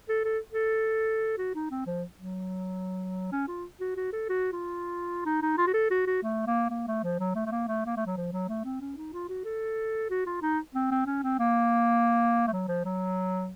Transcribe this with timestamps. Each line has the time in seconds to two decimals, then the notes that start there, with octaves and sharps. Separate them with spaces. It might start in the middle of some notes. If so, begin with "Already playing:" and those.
0.09 A4
0.25 A4
0.52 A4
1.38 F#4
1.55 D#4
1.71 C4
1.86 F3
2.19 F#3
3.32 C#4
3.48 F4
3.80 F#4
3.97 F#4
4.13 A4
4.29 F#4
4.52 F4
5.26 D#4
5.42 D#4
5.58 F4
5.67 F#4
5.74 A4
5.91 F#4
6.07 F#4
6.23 A3
6.47 A#3
6.70 A#3
6.88 A3
7.03 F3
7.19 F#3
7.35 A3
7.46 A3
7.52 A#3
7.68 A3
7.86 A#3
7.97 A3
8.07 F#3
8.17 F3
8.32 F#3
8.49 A3
8.65 C4
8.81 C#4
8.97 D#4
9.13 F4
9.29 F#4
9.45 A4
10.10 F#4
10.26 F4
10.42 D#4
10.75 C4
10.91 C4
11.06 C#4
11.23 C4
11.39 A#3
12.48 A3
12.53 F#3
12.68 F3
12.85 F#3